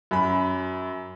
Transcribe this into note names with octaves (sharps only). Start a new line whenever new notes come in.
F#2 B5